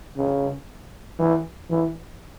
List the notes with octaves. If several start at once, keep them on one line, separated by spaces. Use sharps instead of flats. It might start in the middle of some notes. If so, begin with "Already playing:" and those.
C#3
E3
E3